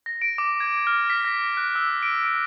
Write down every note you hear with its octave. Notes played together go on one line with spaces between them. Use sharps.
A#6
D7
D6
G#6
F6
B6
A#6
F#6
E6
D7
D7